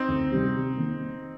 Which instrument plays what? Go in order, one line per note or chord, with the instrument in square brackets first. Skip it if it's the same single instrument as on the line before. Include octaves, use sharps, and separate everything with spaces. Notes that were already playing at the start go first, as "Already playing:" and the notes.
Already playing: [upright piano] C4 D#4
[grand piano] D2
C3 D#3 G3 C4
C3
D#3 A#3